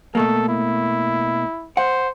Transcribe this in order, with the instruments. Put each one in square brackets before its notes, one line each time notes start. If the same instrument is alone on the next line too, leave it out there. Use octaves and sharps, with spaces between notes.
[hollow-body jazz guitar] B2 A3 A#3 [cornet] A4
[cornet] E4
[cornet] C5 [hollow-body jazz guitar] F#5